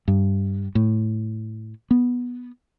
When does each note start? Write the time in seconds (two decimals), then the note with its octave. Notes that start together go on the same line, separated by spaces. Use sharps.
0.08 G2
0.75 A2
1.91 B3